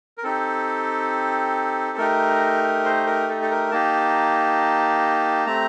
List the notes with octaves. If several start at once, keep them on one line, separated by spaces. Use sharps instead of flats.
A#4
C4 D#4 G4 A4
A3 D#4 G4 A#4
C5
A#4
A4
A4
A#4
A#3 D#4 G4 A5
A3 C4 G4 A#5